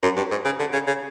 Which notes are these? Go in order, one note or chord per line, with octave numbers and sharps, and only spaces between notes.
F#2
G2
G#2
C#3
D3
C#3
C#3